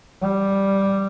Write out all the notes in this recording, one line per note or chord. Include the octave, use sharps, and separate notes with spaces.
G3